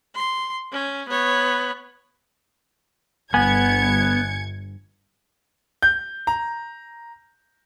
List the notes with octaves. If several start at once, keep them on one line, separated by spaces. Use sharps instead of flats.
C6
C#4
B3 C#5
G1 B3 G#5 G#6 C#7
G6
A#5